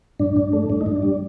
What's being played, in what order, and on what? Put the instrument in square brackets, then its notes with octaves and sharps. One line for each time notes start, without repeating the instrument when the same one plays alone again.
[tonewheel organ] G2 D4
G2
A3
G2 D4
D#4
G2
D4
G3